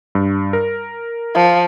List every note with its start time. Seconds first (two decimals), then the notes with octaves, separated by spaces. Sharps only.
0.15 G2
0.53 A#4
1.35 F3